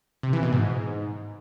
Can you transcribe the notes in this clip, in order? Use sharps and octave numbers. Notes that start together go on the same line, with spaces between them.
C3
E3
B2
G#2